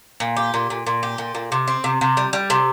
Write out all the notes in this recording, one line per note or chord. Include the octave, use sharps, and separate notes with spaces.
A#2
G4
A#2
A#2
A#2
G4
A#2
A#2
C3
C4
C3
C3
G3
G3
C3